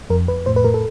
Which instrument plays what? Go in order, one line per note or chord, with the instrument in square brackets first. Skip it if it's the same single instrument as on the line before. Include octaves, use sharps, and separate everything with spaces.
[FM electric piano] F2 A#4
F2 B4
A2 C5
B4
A2 A#4
A4